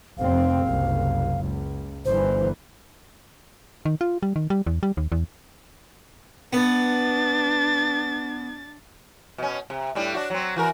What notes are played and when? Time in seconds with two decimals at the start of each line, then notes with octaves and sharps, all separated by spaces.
0.18 F1 C4 F5
0.63 F#1 C2
1.41 C#2
2.05 G1 E3 C5
3.85 D#3
4.01 F4
4.23 G3
4.36 D#3
4.50 G3
4.67 E2
4.83 G3
4.97 D#2
5.12 E2
6.53 B3 D4 A6
9.38 B2 C#4
9.70 C3
9.95 A2 G3 D4
10.14 D4 F#4
10.30 F#3 C4
10.56 E3 F#4 A#4